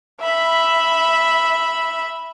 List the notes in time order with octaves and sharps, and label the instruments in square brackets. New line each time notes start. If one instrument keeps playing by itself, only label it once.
[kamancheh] E5 B5